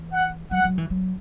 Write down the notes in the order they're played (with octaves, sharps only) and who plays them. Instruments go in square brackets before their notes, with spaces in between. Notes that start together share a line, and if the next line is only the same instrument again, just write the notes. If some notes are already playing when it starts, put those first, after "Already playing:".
Already playing: [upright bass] E3
[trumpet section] F#5
[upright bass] F#3 [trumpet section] F#5
[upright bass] F#3
E3
F#3